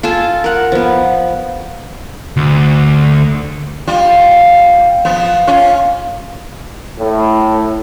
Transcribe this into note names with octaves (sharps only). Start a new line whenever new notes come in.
F4 A4 G#5 A5
A#4 F#5
F3 B3
D2
G3 F4
F3 B3
C#4 F4
A2